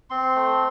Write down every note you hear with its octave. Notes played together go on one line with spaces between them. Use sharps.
C4 C6
A3